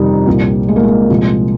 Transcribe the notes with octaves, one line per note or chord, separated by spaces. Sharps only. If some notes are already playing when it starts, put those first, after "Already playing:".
Already playing: F2 C3 D#3 G3 D#4
C2 A#2 F3
G#3
A#3
G#3
C2 A#2 F3